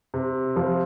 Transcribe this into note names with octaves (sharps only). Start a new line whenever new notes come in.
C3
F3